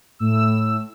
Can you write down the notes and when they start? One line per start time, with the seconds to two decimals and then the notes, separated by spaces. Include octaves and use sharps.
0.19 A2 E6